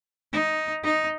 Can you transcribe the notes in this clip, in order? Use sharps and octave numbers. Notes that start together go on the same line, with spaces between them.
D#4
D#4